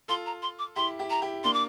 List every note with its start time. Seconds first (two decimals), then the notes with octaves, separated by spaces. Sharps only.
0.08 F4 A4 C6
0.26 A#5
0.42 C6
0.59 D6
0.76 E4 G4 C6
0.99 E4 G4
1.10 A#5
1.22 E4 G4
1.44 A#3 D4 C6
1.54 D6